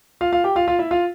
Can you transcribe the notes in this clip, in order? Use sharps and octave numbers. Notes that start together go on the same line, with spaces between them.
F4 F5
F4 F5
G4 G5
F4 F5
F4 F5
E4 E5
F4 F5